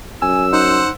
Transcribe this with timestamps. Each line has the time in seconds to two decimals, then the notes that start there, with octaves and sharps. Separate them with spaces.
0.22 F#2 G#5 E6
0.53 D#4 C5 F#5